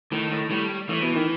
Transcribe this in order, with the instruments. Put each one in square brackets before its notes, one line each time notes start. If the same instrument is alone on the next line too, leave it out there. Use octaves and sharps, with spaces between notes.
[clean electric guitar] A2 [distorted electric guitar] D#3
[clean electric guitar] A2
[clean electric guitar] A2 [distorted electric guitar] G3
[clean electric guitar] A2 [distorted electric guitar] E3
[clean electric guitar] B2
D#3